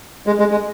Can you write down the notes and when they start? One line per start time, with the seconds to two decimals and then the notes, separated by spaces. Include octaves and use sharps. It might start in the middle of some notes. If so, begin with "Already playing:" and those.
0.27 G#3
0.39 G#3
0.51 G#3